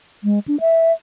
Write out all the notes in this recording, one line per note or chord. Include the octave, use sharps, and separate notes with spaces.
G#3
D4
E5